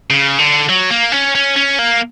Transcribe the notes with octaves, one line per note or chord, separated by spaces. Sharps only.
C#3
D3
F#3
A#3
C#4
C#4
C#4
A#3